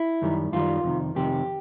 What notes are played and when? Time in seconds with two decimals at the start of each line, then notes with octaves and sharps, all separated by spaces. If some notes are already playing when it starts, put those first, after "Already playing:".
Already playing: E4
0.22 F#2 D#3 G3
0.52 F#2 D#3 G3 F4
0.84 F2 C3 D#3
1.15 F2 C3 D#3 G4